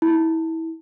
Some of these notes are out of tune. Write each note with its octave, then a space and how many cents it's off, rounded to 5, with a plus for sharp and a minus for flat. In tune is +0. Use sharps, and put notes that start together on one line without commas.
E4 -25